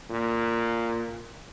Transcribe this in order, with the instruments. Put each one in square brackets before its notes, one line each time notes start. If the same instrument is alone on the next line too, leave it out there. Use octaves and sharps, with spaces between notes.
[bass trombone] A#2